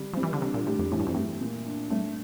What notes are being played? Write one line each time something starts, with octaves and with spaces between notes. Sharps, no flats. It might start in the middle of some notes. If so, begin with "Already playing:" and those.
Already playing: D3 G3
F3 G3
E3
D3
C3 D4
A#2
A2 G4
F2
A2 E3
G2
F2
G2 A3
A#2
D4
G2 A3